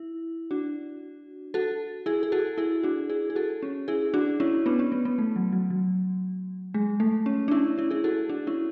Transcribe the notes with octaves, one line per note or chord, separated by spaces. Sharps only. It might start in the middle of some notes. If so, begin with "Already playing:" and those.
Already playing: E4
D4 F#4
F#4 A4
E4 G#4
G#4
F#4 A4
E4 G#4
D4 F#4
E4 G#4
G#4
F#4 A4
C#4
E4 G#4
D4 F#4
C#4 E4
B3 D4
C#4
B3
B3
A3
F#3
F#3
F#3
G#3
A3
C#4
D4
C#4 E4
C#4 E4
E4 G#4
F#4 A4
D4 F#4
C#4 E4